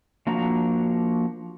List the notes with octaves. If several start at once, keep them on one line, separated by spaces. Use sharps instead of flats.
F3 A#3 D4 F#4 A#5